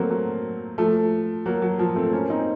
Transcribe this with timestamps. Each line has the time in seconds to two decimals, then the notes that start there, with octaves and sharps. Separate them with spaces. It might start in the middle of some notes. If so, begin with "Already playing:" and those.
Already playing: F#3 A3 A#3 C4
0.10 F#3
0.78 F3 A3
1.46 F#3 A#3
1.62 F#3
1.79 F3
1.96 A3 C4
2.13 A#3 C#4
2.30 C4 D#4